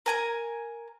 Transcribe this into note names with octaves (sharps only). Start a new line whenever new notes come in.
A#4 G#5 A#5